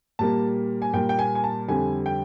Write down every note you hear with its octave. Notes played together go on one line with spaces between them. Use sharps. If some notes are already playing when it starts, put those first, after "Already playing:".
A#2 G3 A#3 A5
G#5
A#2 G3 A#3 G5
G5
G#5
G#5
A5
F2 D3 G3 G#5
G5